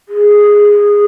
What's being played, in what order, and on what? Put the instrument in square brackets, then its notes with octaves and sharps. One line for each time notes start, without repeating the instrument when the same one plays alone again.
[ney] G#4